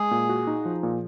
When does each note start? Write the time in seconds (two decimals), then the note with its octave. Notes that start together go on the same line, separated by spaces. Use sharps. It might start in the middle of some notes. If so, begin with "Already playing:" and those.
Already playing: G#3 G#4
0.11 A#2
0.29 F#4
0.47 D#4
0.65 F3
0.83 A#2